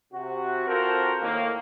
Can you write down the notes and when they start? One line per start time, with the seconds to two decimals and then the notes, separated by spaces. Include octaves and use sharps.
0.14 C3 F#4
0.68 C4 F4 F#4 A4 A#4 C5
1.22 A2 D#3 A#3